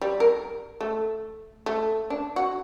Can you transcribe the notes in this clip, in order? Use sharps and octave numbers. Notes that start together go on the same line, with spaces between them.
G3
A#4
A3
A3
D4
F#4